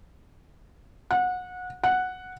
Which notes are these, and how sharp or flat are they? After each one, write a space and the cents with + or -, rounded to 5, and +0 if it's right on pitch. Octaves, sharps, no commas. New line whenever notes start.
F#5 -25
F#5 -5